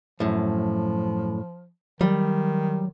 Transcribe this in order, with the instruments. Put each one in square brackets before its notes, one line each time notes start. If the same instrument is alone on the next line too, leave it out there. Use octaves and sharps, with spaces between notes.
[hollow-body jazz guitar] F#2 A2 [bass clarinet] F3
[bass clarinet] D#3 [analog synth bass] F#3 [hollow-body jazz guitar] G3